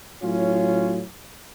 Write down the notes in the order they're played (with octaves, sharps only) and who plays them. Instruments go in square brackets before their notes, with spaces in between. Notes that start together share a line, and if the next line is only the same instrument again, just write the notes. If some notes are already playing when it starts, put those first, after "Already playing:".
[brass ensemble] A2 F#3 C#4 F4 C#5